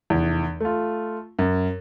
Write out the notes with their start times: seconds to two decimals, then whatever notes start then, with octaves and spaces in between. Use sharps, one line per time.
0.10 F1 E2
0.60 A3 F4
1.39 F#2